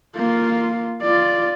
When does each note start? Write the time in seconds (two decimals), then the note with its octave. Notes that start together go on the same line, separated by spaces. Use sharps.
0.16 A#3 F4
1.02 F4 D5